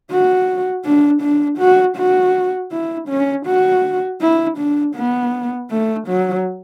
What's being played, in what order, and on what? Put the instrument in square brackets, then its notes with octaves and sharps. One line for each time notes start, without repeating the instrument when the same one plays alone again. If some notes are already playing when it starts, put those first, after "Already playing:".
[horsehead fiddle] F#4
D4
D4
F#4
F#4
E4
C#4
F#4
E4
D4
B3
A3
F#3